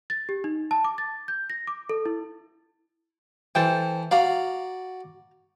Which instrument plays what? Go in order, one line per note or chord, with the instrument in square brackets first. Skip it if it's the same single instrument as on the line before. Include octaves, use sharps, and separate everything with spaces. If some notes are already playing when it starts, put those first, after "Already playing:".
[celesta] A6
G4
D#4
A5
D6
A6
G6
A#6
D6
A4
E4
[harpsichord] E3 [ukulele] A4 C5 G5
[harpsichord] F#4 D5 [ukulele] F5 A#5